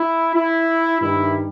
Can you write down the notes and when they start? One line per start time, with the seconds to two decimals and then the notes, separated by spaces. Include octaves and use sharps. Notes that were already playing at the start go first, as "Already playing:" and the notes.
Already playing: E4
0.34 E4
1.00 G2 D#3 G3 E4